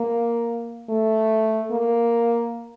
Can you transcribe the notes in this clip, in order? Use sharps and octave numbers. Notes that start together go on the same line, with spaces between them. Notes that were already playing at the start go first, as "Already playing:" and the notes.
Already playing: A#3
A3
A#3